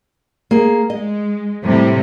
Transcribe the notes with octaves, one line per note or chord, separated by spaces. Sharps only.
A#3 G#4
G#3 D#5
A2 C3 G3